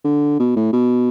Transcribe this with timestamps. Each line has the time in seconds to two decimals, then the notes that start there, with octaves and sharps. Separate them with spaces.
0.05 D3
0.40 B2
0.56 A2
0.73 B2